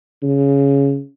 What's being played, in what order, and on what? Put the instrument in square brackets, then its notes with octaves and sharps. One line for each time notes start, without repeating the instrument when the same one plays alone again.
[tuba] C#3